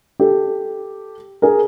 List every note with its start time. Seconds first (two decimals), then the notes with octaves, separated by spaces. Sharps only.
0.20 G4 A4
1.42 G#4 A#4